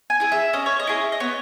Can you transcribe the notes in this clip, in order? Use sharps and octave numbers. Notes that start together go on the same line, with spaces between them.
G#5
E4 G#4
E5
C#4 D#5
C#5
D#5
E4 G#4
D#5
B3 C#5